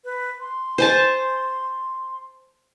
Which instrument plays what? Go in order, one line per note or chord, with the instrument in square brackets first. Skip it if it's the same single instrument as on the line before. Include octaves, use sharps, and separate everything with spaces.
[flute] B4
C6
[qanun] C5 G#5 A5